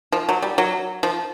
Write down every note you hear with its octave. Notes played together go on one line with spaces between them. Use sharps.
F3
F#3
G3
F#3
F3